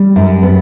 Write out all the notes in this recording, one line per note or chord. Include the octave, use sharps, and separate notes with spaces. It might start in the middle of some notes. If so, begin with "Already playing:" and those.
Already playing: G3
F#2
B3